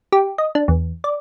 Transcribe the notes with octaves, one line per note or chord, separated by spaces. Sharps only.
G4
D#5
D4
E2
D5